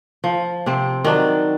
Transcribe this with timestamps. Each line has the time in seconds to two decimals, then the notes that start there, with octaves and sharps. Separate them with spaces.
0.24 F3
0.66 C3 C4
1.04 D#3 F#3 D4